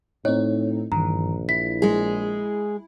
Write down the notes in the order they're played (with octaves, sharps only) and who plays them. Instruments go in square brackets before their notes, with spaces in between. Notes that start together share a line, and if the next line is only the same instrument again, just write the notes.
[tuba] A2 [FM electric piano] C4 D#4 [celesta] C#5
[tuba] A#1 [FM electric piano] G2 D#3 E3 [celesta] A#5
[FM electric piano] E4 [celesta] B6
[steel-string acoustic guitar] G#3 G#4